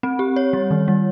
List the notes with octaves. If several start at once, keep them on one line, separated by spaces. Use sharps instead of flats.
C4
G4
C#5
G3
D#3
G3